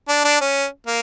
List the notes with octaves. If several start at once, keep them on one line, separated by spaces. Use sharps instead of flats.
D4
D4
C#4
A#3